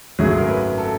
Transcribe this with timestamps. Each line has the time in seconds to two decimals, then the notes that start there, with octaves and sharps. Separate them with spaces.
0.19 G#1 F#2 C#3 F#3 A3 G#4
0.38 A#4
0.49 B4
0.78 A4